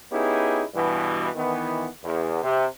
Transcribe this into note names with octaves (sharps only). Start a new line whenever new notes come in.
B3 C#4 D#4 E4 G4 G#4
G2 B2 E3
D#3 E3 B3
E2
C3